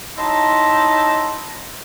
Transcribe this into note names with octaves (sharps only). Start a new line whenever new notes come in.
F#3 D#4 E4 A5 A#5 C6